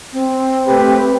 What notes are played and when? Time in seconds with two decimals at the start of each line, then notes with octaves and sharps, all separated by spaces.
0.13 C4
0.67 A3 G4 B4